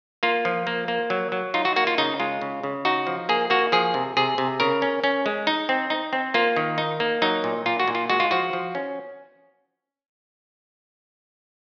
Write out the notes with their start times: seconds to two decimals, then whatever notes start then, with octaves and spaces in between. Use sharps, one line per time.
0.23 A#3 F4
0.45 F3
0.67 A#3
0.88 A#3
1.10 F#3
1.32 F#3
1.54 D#4 F4
1.65 F#4
1.76 A#3 F#4
1.87 F4
1.98 C#3 D#4
2.20 G#3 F4
2.42 C#3
2.63 C#3
2.85 D#4 F#4
3.07 F3
3.29 A#3 G#4
3.50 A#3 F#4
3.72 F3 G#4
3.94 C3
4.17 C3 G#4
4.38 C3
4.60 C#3 A#4
4.82 C#4
5.04 C#4
5.26 G#3
5.47 D#4
5.69 C4
5.90 D#4
6.13 C4
6.34 A#3 F4
6.56 D#3
6.78 D#4
7.00 A#3
7.22 F#3 D#4
7.44 A#2
7.66 A#2 F4
7.80 F#4
7.88 A#2
7.95 F4
8.10 G#3 F#4
8.20 F4
8.31 F3 F#4
8.53 F3
8.75 C#4